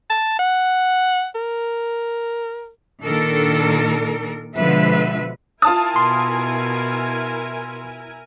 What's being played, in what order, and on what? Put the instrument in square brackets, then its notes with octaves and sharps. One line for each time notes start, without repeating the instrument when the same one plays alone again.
[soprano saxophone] A5
F#5
A#4
[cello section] A#2 D#3 D4 A4 A#4
B2 D3 F3 G#3 B4 E5
[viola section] E4 A#4 G#5 [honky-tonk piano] F4 A5 D#6
[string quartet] B2 [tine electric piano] C6